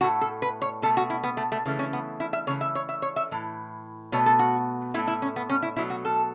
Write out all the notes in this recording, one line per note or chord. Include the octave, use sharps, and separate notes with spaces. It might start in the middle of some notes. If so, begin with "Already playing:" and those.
A2 A3 F#4
A4
B4
C#5
B2 A3 A4
F#4
E4
B3
A3
A3
C#3 E3 A3
C#4
B3
E4
E5
C#3 E3 A3 C#5
E5
C#5
E5
C#5
E5
A2 E3
B2 A3 C#5
A4
F#4
A2 A3 E4
E4
C#4
B3
C#4
E4
B2 F#3 A3 E4
F#4
A4